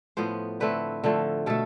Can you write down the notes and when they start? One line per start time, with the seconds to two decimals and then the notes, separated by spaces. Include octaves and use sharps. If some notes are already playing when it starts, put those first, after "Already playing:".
0.17 A2 F3 B3 C5
0.60 D3 A3 C4 B4
1.04 D3 F3 A3
1.46 B2 A3 A4